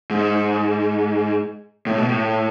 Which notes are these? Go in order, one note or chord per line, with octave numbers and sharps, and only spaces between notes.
G#2
A2
B2
A2